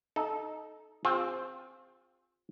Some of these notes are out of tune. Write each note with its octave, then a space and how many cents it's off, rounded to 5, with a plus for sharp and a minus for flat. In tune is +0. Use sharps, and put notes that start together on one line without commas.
D#4 +0 A4 -15
C4 +0 F4 +20 G#4 -30